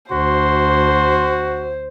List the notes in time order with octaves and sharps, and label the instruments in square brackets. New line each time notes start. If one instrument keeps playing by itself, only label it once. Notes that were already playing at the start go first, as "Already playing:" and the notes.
[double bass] D2 [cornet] F#4 [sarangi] C5 [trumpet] C6